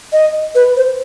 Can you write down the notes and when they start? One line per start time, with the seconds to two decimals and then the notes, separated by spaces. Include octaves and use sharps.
0.13 D#5
0.55 B4
0.77 C5